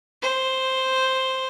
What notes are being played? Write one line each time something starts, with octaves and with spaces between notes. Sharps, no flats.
C5